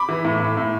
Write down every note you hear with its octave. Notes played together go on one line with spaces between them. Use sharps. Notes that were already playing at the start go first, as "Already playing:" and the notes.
Already playing: B5 D6
E3
A2
A2
A2